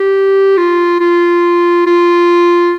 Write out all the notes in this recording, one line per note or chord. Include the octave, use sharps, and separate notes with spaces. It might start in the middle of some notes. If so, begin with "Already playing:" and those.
Already playing: G4
F4
F4
F4